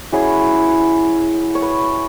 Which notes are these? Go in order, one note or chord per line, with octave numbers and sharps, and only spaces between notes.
F#3 C#4 E4 G#4
C#5
B4